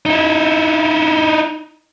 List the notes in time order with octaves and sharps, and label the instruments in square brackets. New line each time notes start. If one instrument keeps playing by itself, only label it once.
[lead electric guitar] D#4 E4